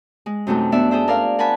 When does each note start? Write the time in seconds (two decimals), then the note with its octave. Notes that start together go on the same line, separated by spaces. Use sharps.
0.26 G#3
0.47 F#2 C3 F#3 G3 A3 D#4
0.72 B3 D4 D5 E5
0.91 G#4 A4 C5 E5
1.08 A#4 D5 F5
1.39 A#4 F#5 G#5 A5 B5